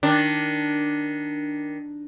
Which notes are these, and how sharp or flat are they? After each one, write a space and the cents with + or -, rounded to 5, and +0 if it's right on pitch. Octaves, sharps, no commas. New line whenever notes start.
D#3 +5 D4 +0